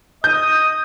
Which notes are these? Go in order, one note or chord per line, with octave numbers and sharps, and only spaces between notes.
D#5 D#6 G6